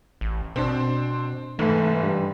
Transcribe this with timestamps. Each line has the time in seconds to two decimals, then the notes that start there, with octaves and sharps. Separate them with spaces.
0.21 A1
0.56 B2 C4 D4
1.59 F1 G#2 E3 A3 B4
2.01 G2